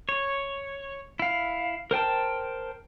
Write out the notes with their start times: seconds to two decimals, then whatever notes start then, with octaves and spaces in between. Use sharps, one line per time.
0.09 C#5
1.19 E4 F5
1.91 A#4 C5 G5 A5